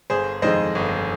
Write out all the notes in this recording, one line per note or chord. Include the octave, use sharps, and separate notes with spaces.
G1 G#4 C5
F2 D#3 G#3 C5 D#5
G1